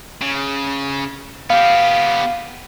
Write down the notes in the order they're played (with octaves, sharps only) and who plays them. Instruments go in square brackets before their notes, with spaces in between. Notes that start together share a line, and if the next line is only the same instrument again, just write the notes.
[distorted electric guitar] C#3
[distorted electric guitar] B3 G4 [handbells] F5